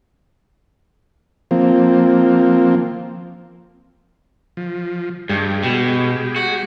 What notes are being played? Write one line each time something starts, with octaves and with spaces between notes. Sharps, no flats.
F3 A#3 C4
F3
G2 G#3 G4
B2
F#4